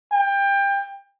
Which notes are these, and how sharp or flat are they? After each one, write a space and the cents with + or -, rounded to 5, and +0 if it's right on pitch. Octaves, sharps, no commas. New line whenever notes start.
G5 +25